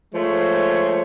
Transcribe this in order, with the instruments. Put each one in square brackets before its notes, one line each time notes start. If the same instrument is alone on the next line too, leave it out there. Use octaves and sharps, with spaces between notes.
[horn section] F3 G#3 A3 C5 C#5